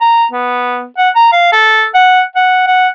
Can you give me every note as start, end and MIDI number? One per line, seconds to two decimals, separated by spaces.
0.01 0.25 82
0.31 0.86 59
0.98 1.10 78
1.15 1.28 82
1.32 1.48 77
1.52 1.86 69
1.94 2.22 78
2.35 2.66 78
2.67 2.88 78